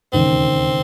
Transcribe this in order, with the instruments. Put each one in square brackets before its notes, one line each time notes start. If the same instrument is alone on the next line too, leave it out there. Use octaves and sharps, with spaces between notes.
[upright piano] E1 D#2 C#3 [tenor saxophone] C4